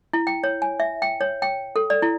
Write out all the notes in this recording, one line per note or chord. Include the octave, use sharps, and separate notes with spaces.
E4
G5
C#5
G#5
E5
G5
C#5
G5
A4
D5
E4